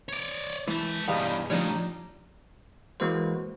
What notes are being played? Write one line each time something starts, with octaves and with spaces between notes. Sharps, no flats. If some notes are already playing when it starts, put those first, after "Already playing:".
C#5 D5
E3 G#3 A5
E2 G2 B2 B3 D#4 G4 D#5 F5
A2 F3 G3 D4 D#4 F4 C#5
E3 G#3 A#3 F#4 B4 C5